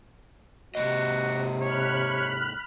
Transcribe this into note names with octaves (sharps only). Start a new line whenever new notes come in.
G#2 C3 A#3 F#4 D#5
C#5 B5 F6 F#6